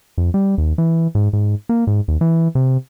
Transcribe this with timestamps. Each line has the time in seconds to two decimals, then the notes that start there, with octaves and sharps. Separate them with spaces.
0.18 F2
0.34 G3
0.58 D#2
0.78 E3
1.15 G#2
1.33 G#2
1.69 A#3
1.87 G#2
2.08 D#2
2.21 E3
2.55 C3